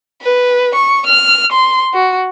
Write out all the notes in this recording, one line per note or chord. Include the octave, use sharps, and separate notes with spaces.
B4
C#6
F6
C6
F#4